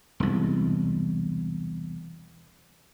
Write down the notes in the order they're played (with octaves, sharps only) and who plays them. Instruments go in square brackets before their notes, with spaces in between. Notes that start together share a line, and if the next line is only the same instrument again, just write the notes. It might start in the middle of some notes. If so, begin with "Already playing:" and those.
[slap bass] E1 C2